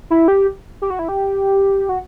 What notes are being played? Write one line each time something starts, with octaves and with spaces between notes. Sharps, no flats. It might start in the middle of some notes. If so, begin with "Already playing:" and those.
E4
G4
G4
F#4
E4
G4
F#4